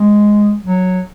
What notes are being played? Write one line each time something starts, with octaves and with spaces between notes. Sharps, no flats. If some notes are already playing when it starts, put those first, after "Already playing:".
Already playing: G#3
F#3